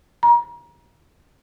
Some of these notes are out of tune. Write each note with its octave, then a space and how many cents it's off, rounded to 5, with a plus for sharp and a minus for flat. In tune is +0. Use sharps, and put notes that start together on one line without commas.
A#5 +30